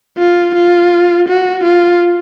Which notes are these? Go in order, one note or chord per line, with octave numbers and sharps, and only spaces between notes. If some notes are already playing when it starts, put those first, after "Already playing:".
F4
F4
F#4
F4